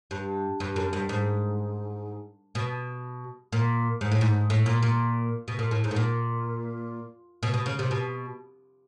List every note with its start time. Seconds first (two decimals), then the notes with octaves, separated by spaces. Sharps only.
0.11 G2
0.60 G2
0.76 F#2
0.93 G2
1.09 G#2
2.55 B2
3.52 A#2
4.01 G#2
4.12 A2
4.21 G#2
4.50 A2
4.66 A#2
4.82 A#2
5.48 B2
5.59 A#2
5.71 A2
5.84 G#2
5.91 A2
5.96 A#2
7.43 B2
7.54 B2
7.66 C#3
7.79 C3
7.91 B2